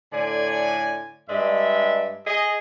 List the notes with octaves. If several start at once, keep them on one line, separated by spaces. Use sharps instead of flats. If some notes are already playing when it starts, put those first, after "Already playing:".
A2 D3 D5 G#5
G2 G#3 D5 E5
G#4 D#5